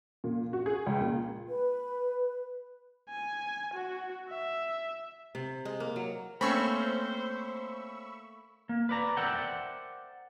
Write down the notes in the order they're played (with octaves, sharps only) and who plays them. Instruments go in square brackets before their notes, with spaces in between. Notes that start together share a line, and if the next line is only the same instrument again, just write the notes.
[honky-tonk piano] A#2
F#4
G#4
C#2
A#2
[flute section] B4
[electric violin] G#5
F#4
E5
[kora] C3
G#3
A#3
F#3
[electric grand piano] A3 A#3 [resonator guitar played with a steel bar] C4 C#4 [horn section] C5 [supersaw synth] B5 C#6 E6
[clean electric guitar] A#3
B4 D5 A#5
A#4 C5 D5 E5 F#5 G5